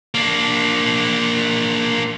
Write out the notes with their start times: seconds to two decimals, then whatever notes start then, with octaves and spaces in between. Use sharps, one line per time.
0.15 A#3 D4